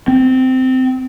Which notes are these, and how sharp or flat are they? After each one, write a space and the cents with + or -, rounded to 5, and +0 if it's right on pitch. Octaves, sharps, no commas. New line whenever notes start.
C4 -15